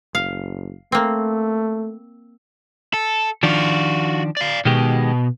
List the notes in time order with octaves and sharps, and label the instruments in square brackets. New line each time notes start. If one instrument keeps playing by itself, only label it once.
[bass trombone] F#1 [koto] F5
[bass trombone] A3 [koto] A#3 C4
[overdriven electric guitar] A4
[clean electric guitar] D#3 F3 D4 [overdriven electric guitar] F4 F#4
[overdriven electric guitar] D5 F5
[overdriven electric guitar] B2 [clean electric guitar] D#3 G#3 G4